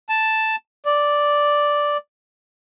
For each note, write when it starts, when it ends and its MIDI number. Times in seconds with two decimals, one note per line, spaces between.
0.09 0.56 81
0.85 1.97 74